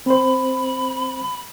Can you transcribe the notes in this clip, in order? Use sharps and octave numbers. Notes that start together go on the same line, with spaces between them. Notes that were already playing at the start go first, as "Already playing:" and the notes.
C4 C5 B5